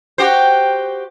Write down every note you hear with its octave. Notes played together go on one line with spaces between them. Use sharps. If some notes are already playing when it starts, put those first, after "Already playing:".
F#4 G4 C5